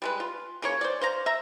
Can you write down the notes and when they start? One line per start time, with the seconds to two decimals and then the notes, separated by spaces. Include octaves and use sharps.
0.02 G3 G#3 B4
0.20 F4
0.62 C#3 A#3 C#5
0.81 C5 D5
1.01 C5 F5 A#5
1.26 E5 A#5